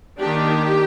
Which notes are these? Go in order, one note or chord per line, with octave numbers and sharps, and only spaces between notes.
D#3 A#3 D4 G4